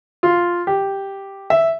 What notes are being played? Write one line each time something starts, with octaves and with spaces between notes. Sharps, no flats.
F4
G4
E5